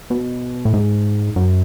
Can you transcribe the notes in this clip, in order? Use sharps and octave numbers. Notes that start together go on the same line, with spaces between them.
B2
A2
G#2
F#2